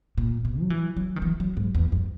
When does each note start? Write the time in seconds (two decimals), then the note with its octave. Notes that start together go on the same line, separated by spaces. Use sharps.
0.18 A#2
0.45 B2
0.61 F#3
0.70 E3
0.97 F#3
1.16 D#3
1.22 E3
1.40 F#3
1.57 G#2
1.75 E2
1.92 F#2